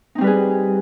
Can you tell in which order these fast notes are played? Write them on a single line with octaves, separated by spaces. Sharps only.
D#4 C4 G3 B4 G#4